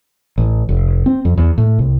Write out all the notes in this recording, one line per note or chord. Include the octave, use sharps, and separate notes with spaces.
A1
F1
C4
F2
E2
A2
C2